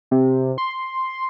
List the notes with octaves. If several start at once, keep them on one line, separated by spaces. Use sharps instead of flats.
C3
C6